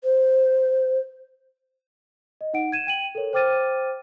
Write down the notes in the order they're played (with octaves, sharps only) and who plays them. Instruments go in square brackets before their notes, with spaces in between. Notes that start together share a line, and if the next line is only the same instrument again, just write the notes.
[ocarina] C5
[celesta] D#5
D#4 F#5 D7
G#6 D#7 E7
G5 D#7 F#7
A4 A#4 C#5
C5 G5 D6 F6 A6 D#7